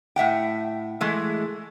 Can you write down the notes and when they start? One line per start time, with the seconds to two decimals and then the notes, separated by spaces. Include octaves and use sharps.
0.16 A2 E5 F#5 G5
1.01 E3 G#3 A3